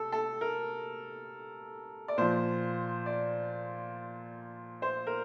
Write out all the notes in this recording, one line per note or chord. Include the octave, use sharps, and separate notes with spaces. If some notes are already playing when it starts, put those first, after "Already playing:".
Already playing: C3 A4
A4
A#4
D5
A#2 F3 C5
D5
C5
A#4